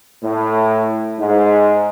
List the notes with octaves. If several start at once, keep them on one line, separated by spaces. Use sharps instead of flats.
A2
G#2